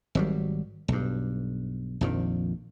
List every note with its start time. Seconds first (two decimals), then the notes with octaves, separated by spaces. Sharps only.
0.15 G#1 F#3 G3
0.88 B1 G2
2.01 A#1 F2 D#3